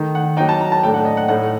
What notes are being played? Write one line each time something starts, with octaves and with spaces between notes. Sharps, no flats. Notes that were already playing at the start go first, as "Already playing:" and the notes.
Already playing: D#3 A3 D#4
F#5
F#3 A#3 D#4 G5
A5
A#5
A5
A2 A3 D4 G5
F#5
D#5
F#5
A2 A3 D#4 F#5